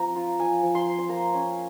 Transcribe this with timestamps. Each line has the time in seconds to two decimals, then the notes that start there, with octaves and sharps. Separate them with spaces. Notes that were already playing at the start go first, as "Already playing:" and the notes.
Already playing: F3 C4 A#5
0.16 F4
0.39 F3 G#5
0.63 F3
0.75 C6
0.86 C4
0.99 C6
1.09 A#3 A#5
1.34 C#4